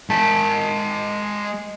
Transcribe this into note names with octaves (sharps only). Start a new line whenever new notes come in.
G#3 A5